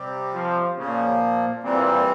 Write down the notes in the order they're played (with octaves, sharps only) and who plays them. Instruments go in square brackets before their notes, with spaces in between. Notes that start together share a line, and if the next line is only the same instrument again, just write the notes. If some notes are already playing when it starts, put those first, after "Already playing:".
Already playing: [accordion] C3 G3 C4 G4
[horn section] F3
[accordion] A#2 F3 A#3 [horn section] C#3
[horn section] A#2 [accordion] E3 G3 C4